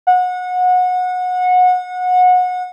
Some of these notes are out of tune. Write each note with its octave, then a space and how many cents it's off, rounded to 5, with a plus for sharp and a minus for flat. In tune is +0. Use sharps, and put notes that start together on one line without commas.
F#5 -25